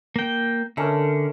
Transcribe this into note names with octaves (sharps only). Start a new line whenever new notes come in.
A#3 G5
D3 A3 C#4 A#4